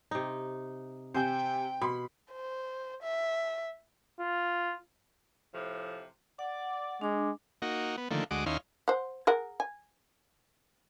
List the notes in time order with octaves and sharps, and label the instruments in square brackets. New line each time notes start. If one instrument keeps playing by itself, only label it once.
[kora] C3 D#4
[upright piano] C3 G#5 G6 [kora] C5 [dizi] G5
[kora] B2 [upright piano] B5 C6
[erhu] C5
E5
[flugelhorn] F4
[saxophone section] A2 C3 F3
[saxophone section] D5 [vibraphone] F#5
[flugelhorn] G#3 [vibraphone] D4 D6
[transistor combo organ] A#3 D#4 F#4
B3
D3 D#3 F3 A3 A#3
D2 G#3 F#4 D#5 D6
D#2 C#4 D#4 E4 F5 C6
[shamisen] C5 F#5
G#4 A#4 F#5
G#5